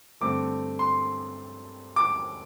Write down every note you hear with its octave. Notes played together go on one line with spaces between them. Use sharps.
G2 D3 A3 C4 D6
C6
D6